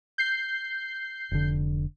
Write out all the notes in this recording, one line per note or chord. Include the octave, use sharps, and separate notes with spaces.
G6 C7
F1 D3